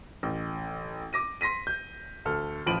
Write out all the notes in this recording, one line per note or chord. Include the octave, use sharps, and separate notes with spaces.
A1
D6 A#6 D#7
C6 A#6 B6 D#7
G6
D2 A4 F6
A1 F3 B5 D7 D#7 F#7